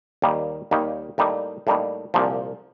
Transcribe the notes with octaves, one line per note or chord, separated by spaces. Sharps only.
D#2 D#3 G3 A#3 D#4
D#2 D#3 G3 A#3 D#4
A2 G3 A#3 D#4
A2 G3 A#3 D#4
C2 A#2 F3